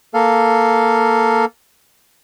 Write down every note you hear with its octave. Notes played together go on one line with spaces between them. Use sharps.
A#3 A4 F5